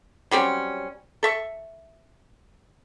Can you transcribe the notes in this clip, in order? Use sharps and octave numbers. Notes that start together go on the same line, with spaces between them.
F#3 G3 C4 C#4
A4 E5 C#6